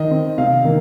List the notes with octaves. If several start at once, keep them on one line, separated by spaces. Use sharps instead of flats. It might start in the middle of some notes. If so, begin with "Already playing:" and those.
Already playing: D#3 D#5
C4
C3 F5
D#3 A#3